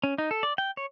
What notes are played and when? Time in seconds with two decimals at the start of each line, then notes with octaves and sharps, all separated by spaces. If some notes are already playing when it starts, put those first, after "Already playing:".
0.04 C#4
0.18 D#4
0.31 A4
0.43 D5
0.58 G5
0.77 C#5